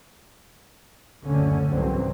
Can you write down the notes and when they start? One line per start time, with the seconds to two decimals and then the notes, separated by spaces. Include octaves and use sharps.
1.26 F#1 D2 A2 D3 C#4
1.70 C2 G#2 D3 E3 F#3 C4